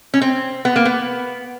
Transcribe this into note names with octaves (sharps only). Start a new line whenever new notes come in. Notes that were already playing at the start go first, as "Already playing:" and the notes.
C#4
C4
B3
A#3
B3